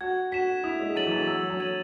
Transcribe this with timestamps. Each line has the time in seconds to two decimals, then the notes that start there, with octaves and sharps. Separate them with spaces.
0.01 F#4 G#6
0.32 F#4 B6 E7
0.64 E4 D#6
0.80 G#3
0.95 F#3 A6 D#7 F#7
1.07 E3
1.12 F#3
1.27 F#3 E6
1.50 F#3
1.60 G#6 D#7 F#7